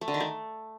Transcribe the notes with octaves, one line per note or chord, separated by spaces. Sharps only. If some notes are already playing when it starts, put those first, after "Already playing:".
A3
D3
D#3
A3